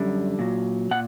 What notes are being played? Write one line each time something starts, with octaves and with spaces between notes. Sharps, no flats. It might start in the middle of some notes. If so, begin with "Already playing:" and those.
Already playing: F#2 D3 G3
A#2 F#3
A#2 F#5